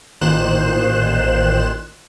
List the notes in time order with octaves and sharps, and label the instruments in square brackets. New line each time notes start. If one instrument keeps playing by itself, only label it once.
[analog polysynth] A1 A#2 D#3 C5 F#6 E7